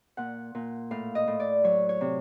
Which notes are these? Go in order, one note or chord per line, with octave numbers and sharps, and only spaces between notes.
A#2 F#5
A#2
A2 F5
D#5
A2
D5
F#3 C#5
C#5
C3